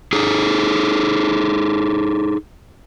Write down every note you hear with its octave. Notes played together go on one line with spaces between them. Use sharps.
D#4 G#4 A4